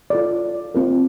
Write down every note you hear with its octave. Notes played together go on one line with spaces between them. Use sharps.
F4 A4 D5
C4 F4 A#4